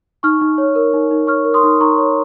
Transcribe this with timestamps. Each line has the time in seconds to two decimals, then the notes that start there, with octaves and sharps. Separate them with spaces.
0.23 D#4 C#6 F6
0.41 D#4
0.58 C#5
0.75 A#4
0.94 D#4
1.11 D#4
1.27 C#5 C#6 F6
1.45 A#4
1.54 C6 D#6
1.63 D#4
1.80 D#4 A#5 C#6
1.98 C#5